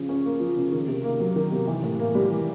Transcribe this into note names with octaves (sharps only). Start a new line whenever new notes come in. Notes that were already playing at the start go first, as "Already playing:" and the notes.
Already playing: C#3 F3
C#4
A#3
F3
C#3
D#3
C3
A#3
F#3
D#3
C3
E3
A2
A#3
G3
E3